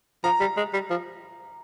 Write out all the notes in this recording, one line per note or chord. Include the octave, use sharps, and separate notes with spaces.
F3 A#5
G3
G#3
G3
F3